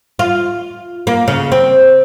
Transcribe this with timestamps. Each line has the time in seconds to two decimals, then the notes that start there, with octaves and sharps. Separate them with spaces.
0.19 F4
1.07 A#3
1.28 C#3
1.52 C4